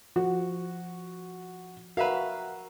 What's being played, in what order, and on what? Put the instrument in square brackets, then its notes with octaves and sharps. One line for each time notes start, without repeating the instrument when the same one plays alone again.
[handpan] F3 [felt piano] F#4
[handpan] F#4 A#4 [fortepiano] B4 E5 F5